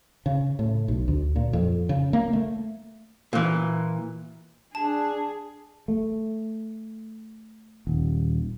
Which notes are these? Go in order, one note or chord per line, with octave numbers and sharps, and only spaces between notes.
C#3
A2
B1
D2
A#2
F2
C#3
A#3
A3
A#2 E3
D4 G#4 A5
A3
D#1